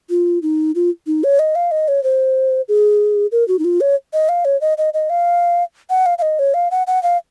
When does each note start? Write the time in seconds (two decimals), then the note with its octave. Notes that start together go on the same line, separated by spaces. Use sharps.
0.10 F4
0.42 D#4
0.75 F4
1.07 D#4
1.24 C#5
1.39 D#5
1.55 F5
1.71 D#5
1.88 C#5
2.03 C5
2.69 G#4
3.32 A#4
3.48 F#4
3.59 D#4
3.64 F4
3.81 C#5
4.13 D#5
4.29 F5
4.45 C#5
4.61 D#5
4.78 D#5
4.94 D#5
5.10 F5
5.90 F#5
6.06 F5
6.18 F5
6.22 D#5
6.39 C#5
6.54 F5
6.71 F#5
6.87 F#5
7.03 F5